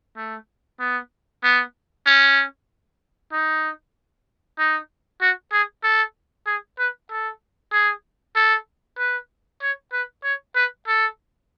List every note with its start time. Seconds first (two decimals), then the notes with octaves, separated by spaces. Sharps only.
0.17 A3
0.80 B3
1.43 B3
2.06 C#4
3.32 D#4
4.58 D#4
5.21 F#4
5.52 G#4
5.83 A4
6.46 G#4
6.79 B4
7.10 A4
7.72 G#4
8.36 A4
8.98 B4
9.62 C#5
9.92 B4
10.24 C#5
10.55 B4
10.87 A4